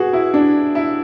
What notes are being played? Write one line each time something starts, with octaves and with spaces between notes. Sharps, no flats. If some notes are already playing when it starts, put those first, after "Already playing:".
Already playing: F#4 G#4 B4
E4
D4
E4